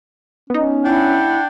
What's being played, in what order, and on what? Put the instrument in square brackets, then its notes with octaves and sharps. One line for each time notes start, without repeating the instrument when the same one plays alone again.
[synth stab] B3 D#4 [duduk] C#4
[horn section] D4 F#5 G5 [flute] E4